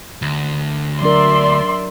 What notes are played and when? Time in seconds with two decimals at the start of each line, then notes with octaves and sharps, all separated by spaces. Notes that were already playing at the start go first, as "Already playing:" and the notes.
0.22 D2
1.01 F#3 D4 A#4 D5 E5 C6